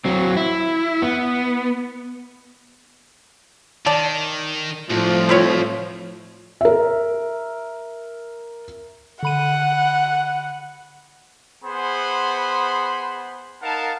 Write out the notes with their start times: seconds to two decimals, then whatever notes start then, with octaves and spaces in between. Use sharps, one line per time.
0.05 F#3 C4
0.36 E4
1.02 B3
3.86 D#3 D5 A5
4.90 C2 A2 F3
5.29 C4 B4 C#5
6.61 A#4 E5
9.23 D3 F#5 B5 D#7
11.64 B3 G#4 C5 F#5 B5 C6
13.62 D#4 A#4 F5 F#5 A5